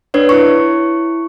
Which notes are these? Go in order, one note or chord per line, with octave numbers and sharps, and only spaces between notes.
D4 B4 C#5
E4 C#6